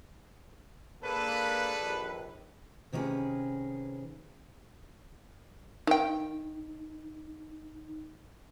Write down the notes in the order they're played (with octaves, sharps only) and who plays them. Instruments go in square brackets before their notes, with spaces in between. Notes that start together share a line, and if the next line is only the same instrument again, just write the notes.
[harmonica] G#3 D4 A4 [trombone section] A#3 [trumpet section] B4
[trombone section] A#1 D#2
[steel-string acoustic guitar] C3 D#3 C#4 F4 G#4 B4
[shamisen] D#3 G5 [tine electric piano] D#4